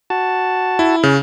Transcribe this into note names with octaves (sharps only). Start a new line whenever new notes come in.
F#4 A5
E4
C#3